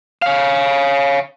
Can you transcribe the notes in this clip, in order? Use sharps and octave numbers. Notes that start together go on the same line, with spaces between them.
C#5 F5